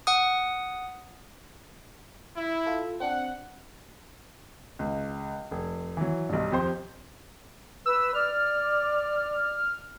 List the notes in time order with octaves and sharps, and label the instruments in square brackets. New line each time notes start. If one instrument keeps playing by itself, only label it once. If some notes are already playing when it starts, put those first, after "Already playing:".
[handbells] F#5 D#6
[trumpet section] E4
[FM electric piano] F4 A4
[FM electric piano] C4 D4 [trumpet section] F#5
[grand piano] C#2
F1
E3 F#3
B1 G2
F2 G4 C5 C6
[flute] B4 [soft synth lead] E6
[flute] D5 [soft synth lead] F6